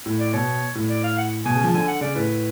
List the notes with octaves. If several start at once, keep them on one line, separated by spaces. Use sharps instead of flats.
A2
D5
B2 C#5
A2
D5
F5
F#5
B2 G#5
C#3
F3
D3 G#5
F#5
C#3 D5
A2 B4